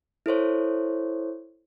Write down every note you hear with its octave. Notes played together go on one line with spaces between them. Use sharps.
E4 A4 C5 C#5